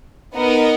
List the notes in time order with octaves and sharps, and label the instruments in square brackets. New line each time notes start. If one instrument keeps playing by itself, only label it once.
[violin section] B3 D#4 A#4 D#5 F#5